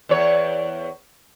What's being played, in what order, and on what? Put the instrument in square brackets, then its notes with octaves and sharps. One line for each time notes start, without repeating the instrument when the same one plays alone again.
[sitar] E2 C#5